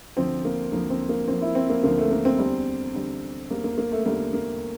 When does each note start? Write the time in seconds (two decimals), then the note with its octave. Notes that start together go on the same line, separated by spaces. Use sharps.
0.16 D2 D3 F3 C4
0.45 A#3
0.72 D2 D3 F3 A#3
0.90 C4
1.09 A#3
1.27 D2 D3 F3 C4
1.42 E4
1.55 C4
1.70 A#3
1.83 D2 D3 F3 A#3
1.98 A3
2.11 A#3
2.25 C4
2.39 E2 D3 G3
2.94 E2 D3 G3
3.50 E2 D3 G3 A#3
3.64 A#3
3.78 A#3
3.92 A3
4.05 E2 D3 G3 A#3
4.33 A#3